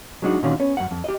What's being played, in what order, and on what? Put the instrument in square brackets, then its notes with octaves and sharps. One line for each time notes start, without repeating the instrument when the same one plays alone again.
[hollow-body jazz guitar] F#3 G#3 D4 D#4 F#4
A#2 D3 D#3 C#4 F4 F#4
B3 C#4
F#2 F#5
F2
G4 D#5